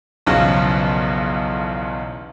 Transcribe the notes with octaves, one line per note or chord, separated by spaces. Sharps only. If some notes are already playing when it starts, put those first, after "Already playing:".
B1 E2 C#3 F3 F#3